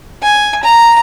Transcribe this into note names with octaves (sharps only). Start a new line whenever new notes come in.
G#5
A#5